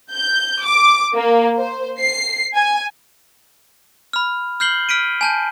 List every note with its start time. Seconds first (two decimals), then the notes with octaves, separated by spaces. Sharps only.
0.12 G6
0.64 D6
1.15 A#3
1.58 C5
1.99 C7
2.56 G#5
4.13 B5 F6
4.60 F6 G6 C7 F#7 G7
4.89 F6 B6 D7 D#7
5.21 G#5 A5 G6